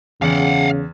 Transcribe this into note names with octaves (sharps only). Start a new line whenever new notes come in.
E2 C#3 F5 F#5